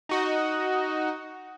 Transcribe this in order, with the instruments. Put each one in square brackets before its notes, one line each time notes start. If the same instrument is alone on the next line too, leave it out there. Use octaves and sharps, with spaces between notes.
[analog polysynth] D#4 F#4 D#5